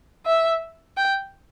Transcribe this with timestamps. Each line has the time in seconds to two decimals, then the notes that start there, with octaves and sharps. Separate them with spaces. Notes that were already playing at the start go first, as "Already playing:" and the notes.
0.26 E5
0.97 G5